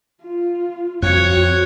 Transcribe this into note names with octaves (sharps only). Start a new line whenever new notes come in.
F4
F2 C4 F#4 C#5 F#6 G#6 C#7